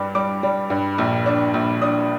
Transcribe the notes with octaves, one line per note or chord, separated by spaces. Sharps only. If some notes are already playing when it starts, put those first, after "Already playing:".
Already playing: G2 G3 D4 D6
G3 D6
G3
G2
A#1
D4
A#1
D4 D#6